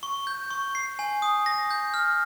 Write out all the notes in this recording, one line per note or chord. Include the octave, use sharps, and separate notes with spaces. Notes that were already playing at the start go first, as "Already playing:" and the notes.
C#6
G6
C#6
C7
G#5
D#6
A#6
G6
F6